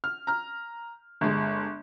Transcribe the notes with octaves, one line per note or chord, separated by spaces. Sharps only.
F6
A#5 F6
G1 G#3